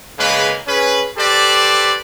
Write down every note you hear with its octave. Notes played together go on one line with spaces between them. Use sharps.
C#3 G#3 A#3 B4
C#4 G#4 B4
G4 A4 B4 C5 D5